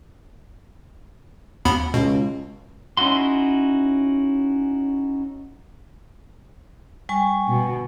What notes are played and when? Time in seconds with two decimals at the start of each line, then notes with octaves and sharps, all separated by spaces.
1.65 D#2 B3 B5
1.94 C#2 B2
2.97 C#4 D#4 E4 F#4 C6
7.09 G3 G#5 C#6
7.47 B2